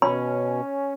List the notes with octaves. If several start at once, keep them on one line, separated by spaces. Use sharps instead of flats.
B2 C#4 B5